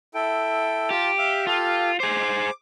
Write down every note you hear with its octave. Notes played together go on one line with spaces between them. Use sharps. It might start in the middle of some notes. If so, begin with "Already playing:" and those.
E4 A4 G5
F4 G4 A5
E5 F5
F4 G4 A4 F5
G#4 C5 D6